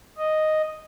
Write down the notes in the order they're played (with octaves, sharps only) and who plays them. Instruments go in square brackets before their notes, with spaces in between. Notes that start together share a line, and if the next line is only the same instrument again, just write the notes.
[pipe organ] D#5